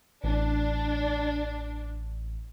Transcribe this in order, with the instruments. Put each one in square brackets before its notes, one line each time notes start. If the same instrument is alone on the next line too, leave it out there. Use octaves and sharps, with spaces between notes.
[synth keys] A1 [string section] D4